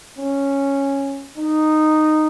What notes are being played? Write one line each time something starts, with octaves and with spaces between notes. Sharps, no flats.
C#4
D#4